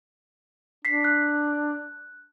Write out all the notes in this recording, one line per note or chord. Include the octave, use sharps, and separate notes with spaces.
D4 B6 C7
F#6